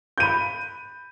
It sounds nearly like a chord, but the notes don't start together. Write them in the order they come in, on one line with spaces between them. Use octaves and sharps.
G6 D#7 B5